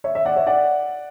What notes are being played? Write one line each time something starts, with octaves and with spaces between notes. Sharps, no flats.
C#5 E5
C#5 E5
D5 F#5
C#5 E5
D5 F#5